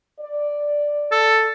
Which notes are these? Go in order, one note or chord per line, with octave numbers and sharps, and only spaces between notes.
D5
A4